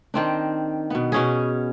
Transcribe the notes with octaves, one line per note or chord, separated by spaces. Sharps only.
D#3 C4 D4
B2 B3
B2 C#4 G#4